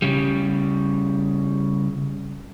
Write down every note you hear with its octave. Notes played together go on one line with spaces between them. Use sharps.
C#3 G3